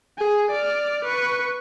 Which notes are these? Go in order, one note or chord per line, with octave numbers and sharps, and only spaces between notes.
G#4
D5 F6
B4 C#6